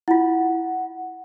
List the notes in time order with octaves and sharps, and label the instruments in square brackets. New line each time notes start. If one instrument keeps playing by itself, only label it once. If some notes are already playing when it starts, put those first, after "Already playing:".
[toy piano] E4 F4 [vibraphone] F#5